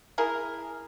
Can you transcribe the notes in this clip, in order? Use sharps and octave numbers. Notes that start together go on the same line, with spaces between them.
E4 G#4 A#4